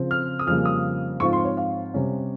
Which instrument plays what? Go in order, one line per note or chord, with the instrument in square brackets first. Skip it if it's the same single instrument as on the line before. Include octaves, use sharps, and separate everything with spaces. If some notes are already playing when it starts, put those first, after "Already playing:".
Already playing: [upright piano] C#3 F3 C4
F6
D#6
F2 C#3 G3 A#3 F6
D#6
G#2 F3 C4 F4 C#6
C6
C#5
F5
C3 G3 C#4